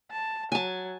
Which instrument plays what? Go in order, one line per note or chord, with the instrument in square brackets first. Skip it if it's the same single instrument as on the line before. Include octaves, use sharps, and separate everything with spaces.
[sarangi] A5
[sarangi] F#3 [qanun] G#5 A5